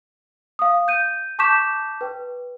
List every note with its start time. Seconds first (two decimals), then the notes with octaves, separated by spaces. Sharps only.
0.59 F5 D#6
0.88 G6 D#7
1.39 A5 C#6 D6 G6 B6 E7
2.01 B4 G5